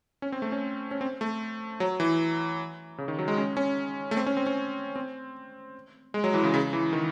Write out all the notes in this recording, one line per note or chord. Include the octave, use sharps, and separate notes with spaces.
C#4
C4
A3
C#4
C#4
C4
A3
F#3
E3
C#3
D#3
F#3
G#3
C#4
C#4
A3
C4
C#4
C4
C#4
C4
G#3
F#3
E3
C#3
C#3
E3
D#3